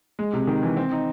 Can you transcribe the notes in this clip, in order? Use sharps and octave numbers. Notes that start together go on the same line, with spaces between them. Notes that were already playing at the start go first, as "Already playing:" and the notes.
G#3
C3
D#3
E3
C4
D#4